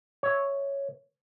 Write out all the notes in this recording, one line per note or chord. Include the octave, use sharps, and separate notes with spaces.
C#5 E5